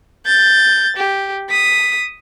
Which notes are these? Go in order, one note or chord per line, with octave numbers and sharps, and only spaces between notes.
G6 A6
G4
D#6 B6